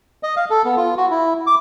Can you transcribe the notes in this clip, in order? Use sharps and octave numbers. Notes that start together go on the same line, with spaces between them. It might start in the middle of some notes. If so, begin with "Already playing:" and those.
D#5
F5
A4
B3
F4
F#4
E4
D6